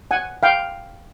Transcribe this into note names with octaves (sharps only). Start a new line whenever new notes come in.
F#5 G#5
F5 G5